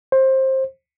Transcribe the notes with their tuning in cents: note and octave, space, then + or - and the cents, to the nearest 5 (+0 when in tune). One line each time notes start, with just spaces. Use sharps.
C5 +20